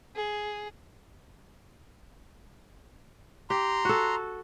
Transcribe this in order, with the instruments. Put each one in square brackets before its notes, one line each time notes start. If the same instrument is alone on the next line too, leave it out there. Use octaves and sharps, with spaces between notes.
[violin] G#4
[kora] G4 [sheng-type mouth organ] A#5 C6
[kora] F#4 A4